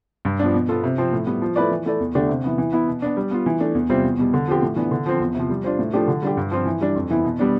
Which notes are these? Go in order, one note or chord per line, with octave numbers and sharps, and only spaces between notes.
G2
F3 B3 D4
B2
B3 F4 A4
C3
F3 C4
A2
G3 B3
F3
A3 E4 B4 D5
E3
A3 E4 A4 D5
E2
D3 A3 D4 G4
C3
E3 B3
E3
B3 E4
B2
B3 D4
G3
B3 F4
E3
A3 D4
E2
C3 G3 C4 F4
E2
B2 G3
D3
F3 C4 G4
A2
E3 B3 D4
D3
F3 C4
E2
C3 F3
G3
D4 F4 C5
A2
F3 A3 D4 G4
D3
G3 D4 G4
G2
F3 C4 F4
E3
G3 D4
F2
E3 B3 E4
B2
G3 B3 D4